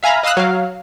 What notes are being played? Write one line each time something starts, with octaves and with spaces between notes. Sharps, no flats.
E5 F5 G#5 A#5 B5
D#5 F5 D#6 E6 F#6
F#3 F5